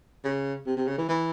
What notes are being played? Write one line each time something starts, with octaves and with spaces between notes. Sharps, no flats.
C#3
C3
C3
C#3
E3
E3